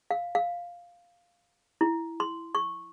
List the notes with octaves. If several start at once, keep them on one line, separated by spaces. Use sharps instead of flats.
F5
F5
E4
C6
C#6